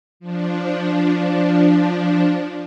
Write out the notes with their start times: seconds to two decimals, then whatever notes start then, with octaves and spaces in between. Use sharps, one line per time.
0.20 F3 D4